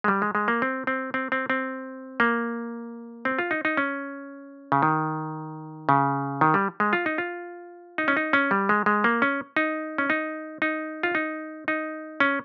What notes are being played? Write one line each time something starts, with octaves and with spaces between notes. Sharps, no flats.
G#3
G3
G#3
G#3
A#3
C4
C4
C4
C4
C4
A#3
C4
F4
D#4
D#4
C#4
C#3
D#3
C#3
D#3
G3
G#3
F4
D#4
F4
D#4
C#4
D#4
C#4
G3
G#3
G#3
A#3
C#4
D#4
C#4
D#4
D#4
F4
D#4
D#4
C#4